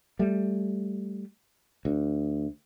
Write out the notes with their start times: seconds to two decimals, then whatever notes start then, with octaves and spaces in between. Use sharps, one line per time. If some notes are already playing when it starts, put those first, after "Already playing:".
0.19 G3 A3
1.85 D2